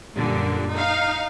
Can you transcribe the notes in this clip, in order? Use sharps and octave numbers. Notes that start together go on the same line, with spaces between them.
F#2 A#2 D3 G3
D#4 F5